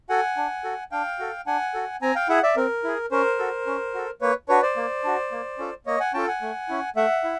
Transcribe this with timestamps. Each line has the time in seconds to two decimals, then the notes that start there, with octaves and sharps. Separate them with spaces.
0.09 F#4 A4 F#5 G#5
0.37 D4
0.64 F#4 A4
0.92 D4 F5 G5
1.19 F#4 A4
1.47 D4 F#5 G#5
1.74 F#4 A4
2.02 C4 G#5 A#5
2.15 F5 G5
2.29 E4 G#4 E5 F#5
2.43 D5 E5
2.56 C4 A#4
2.84 E4 G#4
3.11 C#4 A#4 C5
3.39 F#4 A4
3.67 C#4
3.94 F#4 A4
4.21 A#3 B4 C#5
4.49 D4 F#4 B4 C#5
4.62 C5 D5
4.76 A#3
5.04 D4 F#4
5.32 A#3
5.58 C#4 F4 A4
5.86 A#3 C#5 D#5
6.00 F#5 G#5
6.14 C#4 F4 A4 G5 A5
6.28 F#5 G#5
6.42 A3
6.69 C#4 E4
6.96 A3 E5 F#5
7.24 E4